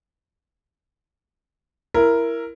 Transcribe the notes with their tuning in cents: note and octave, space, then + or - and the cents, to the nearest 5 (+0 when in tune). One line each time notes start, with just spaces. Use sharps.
E4 +15 A#4 +0